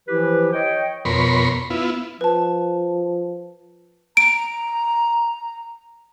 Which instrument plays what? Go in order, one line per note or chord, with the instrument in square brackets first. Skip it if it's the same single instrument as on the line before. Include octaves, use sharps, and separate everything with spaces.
[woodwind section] E3 F3 E4 G4 B4
C#5 D#5 G5
[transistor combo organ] F2 B2 A#4 C#5 B5 C6
B3 E4 F4
[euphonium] F3 [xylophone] B4 A5
[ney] A#5 [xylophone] D7